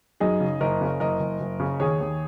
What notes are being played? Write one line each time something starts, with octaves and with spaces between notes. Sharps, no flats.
F#2 D#4 G#4
C#3
F#1 A#4 D#5
C#3
F#1 A#4 D#5
F#1
F#1
C#3
D#2 G#4 C#5
D#2